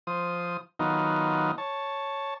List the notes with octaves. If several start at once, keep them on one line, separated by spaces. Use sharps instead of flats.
F3 C5 D#6
D#3 F#3 B3 D#4 F4
C#5 A5